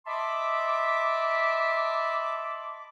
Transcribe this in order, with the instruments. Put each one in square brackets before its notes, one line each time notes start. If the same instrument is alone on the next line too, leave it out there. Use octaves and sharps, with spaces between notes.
[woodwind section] D#5 E5 A5 B5 C6 D6